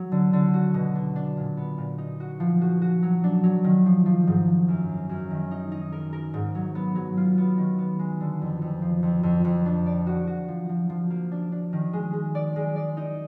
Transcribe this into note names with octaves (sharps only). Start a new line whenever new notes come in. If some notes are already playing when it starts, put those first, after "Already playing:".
Already playing: F#3
D3
D3
F#4
B2
D4
D4
A#2
B3
A#2
D#4
F#4
F3
F#4
F#4
F#3
D4
F#3
D#3
F3
F3
G#2
F3
F#2
A#3
F#2
D#3
D#4
D#4
A#4
A#4
G#2
F#3
B3
F#3
F4
B3
D#3
B3
G#3
D3
F2
F2
F3
F2
F2
F2
D4
D5
F#4
F#4
F3
F3
F3
A#3
D4
D4
D#3
G#3
G#3
D5
G#3
D5
D#4